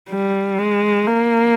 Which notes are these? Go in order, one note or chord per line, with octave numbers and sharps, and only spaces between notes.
G3
G#3
A#3